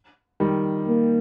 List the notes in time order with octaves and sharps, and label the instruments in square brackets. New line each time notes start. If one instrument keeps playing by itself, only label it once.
[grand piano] D#3 G3
[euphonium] A#3